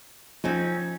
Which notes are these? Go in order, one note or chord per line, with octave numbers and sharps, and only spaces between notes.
F3 C4 C#4 D#4